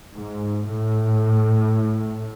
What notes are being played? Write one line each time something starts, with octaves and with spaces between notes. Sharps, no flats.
G#2
A2